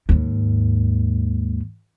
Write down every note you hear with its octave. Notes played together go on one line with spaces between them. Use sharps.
D#2 G#2